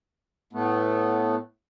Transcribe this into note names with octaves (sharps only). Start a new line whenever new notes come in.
A2 A3 B3